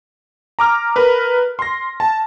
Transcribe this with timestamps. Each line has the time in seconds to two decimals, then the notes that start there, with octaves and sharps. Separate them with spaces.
0.59 A#5 D6 F6
0.96 A#4 B4
1.59 C6 A#6
2.00 A5